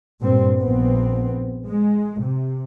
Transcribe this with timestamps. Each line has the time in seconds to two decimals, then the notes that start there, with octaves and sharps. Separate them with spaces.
0.21 G2 A#2 G3 C4
0.58 A#1 B3 C4
1.68 G#3
2.22 C3